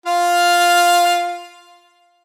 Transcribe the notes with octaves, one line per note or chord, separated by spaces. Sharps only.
F4 F5